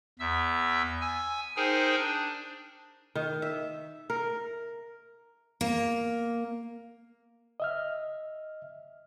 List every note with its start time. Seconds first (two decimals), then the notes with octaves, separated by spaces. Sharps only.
0.19 E2 E5 E6
1.01 G#5 E6
1.56 D#4 G#4 A#4 C5 G5 G#5
1.98 D4
3.15 D#3
3.42 E5
4.10 A#4
5.61 A#3
7.60 D#5 E5 F6